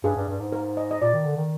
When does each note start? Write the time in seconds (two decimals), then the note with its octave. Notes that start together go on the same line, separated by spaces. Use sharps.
0.04 G2 G#4
0.16 G2
0.28 G2
0.40 G#2
0.52 A#4
0.77 D#5
0.91 D#5
1.01 A#2 D5
1.13 D#3
1.25 D3
1.37 D#3